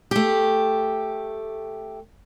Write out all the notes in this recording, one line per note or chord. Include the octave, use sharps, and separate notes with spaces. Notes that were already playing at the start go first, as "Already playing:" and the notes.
A3 G4